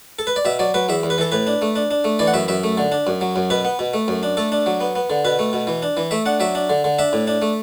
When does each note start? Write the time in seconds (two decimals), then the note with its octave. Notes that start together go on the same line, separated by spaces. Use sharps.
0.19 A4
0.27 B4
0.36 D5
0.45 B2 E5
0.59 F#3 D5
0.74 F#3 B4
0.89 E2 E5
1.03 E2
1.10 B4
1.18 E3 A4
1.32 A2 B4
1.47 D4
1.62 A3
1.76 D4
1.91 D4
2.04 A3
2.19 E3 D5
2.27 F#5
2.34 F#2 E5
2.48 F#2 E5
2.64 A3
2.78 D3
2.92 D4
3.07 F#2
3.21 F#3
3.36 F#2
3.50 B2 B4
3.65 B3
3.79 B2
3.94 A3
4.08 F#2
4.23 D4
4.37 A3 A4
4.52 D4
4.66 F#3
4.81 B3
4.95 B3
5.10 D3
5.25 B2 B4
5.39 A3
5.53 B2
5.67 E3
5.82 D4
5.97 E3
6.11 A3 E5
6.26 D4 F#5
6.40 F#3 E5
6.55 D4
6.70 D3
6.84 D3
6.99 D4 E5
7.13 A2
7.27 D4
7.42 A3